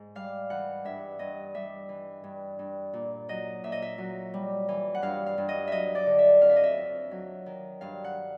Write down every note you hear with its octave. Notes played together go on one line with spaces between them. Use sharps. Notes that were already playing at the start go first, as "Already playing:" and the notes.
Already playing: G#2
G3 F5
E3 F#5
G2 E5
G2 D#5
G3 E5
E3
G2
G2
A#2
F#3 D#5
A#2 E5
D#5
E5
F#3
G3
E3
F#5
G2 F5
F5
G2
D#5
F#3 D#5 E5
D5
D3
E5
F2 F5
E5
D#5
E5
F2
F#3
D#3
G2 F5
F#5